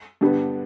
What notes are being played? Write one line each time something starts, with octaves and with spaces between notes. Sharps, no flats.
G2 D3 G3 B3